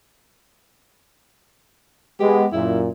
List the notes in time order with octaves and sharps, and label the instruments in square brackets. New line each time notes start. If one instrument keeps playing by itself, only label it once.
[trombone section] G#3 B3 [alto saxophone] G4
[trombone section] F#2 A#2 [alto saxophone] E4